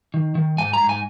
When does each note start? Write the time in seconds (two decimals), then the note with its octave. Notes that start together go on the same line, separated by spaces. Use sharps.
0.14 D#3
0.35 D#3
0.58 G#2 G#5
0.73 A#5
0.81 G#2
0.89 G#5